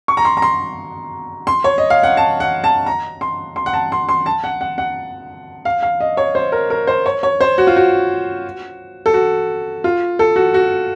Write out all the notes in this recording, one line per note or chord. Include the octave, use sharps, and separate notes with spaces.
C#6
A#5
C6
A#5
C6
C6
C#5
D#5
F5
F#5
A5
F#5
A5
A#5
C6
C6
F#5
A5
C6
C6
A5
F#5
F#5
F#5
F5
F5
D#5
C#5
C5
A#4
A#4
C5
C#5
C#5
C5
F#4
F4
F#4
A4
F#4
F4
A4
F#4
F#4